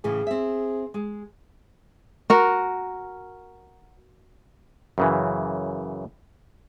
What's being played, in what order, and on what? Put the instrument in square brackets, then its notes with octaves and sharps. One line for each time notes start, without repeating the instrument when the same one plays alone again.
[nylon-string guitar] A2 C#3 E3 [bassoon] G#4
[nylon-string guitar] C4 E5
G#3 G#4
[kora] F#4 A#4
[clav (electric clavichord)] F#2 C#3 E3